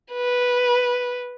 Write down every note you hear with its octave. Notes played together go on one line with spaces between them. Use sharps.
B4